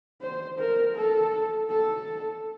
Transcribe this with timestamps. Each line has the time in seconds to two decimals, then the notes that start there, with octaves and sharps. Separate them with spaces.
0.21 C5
0.59 A#4
0.96 A4
1.69 A4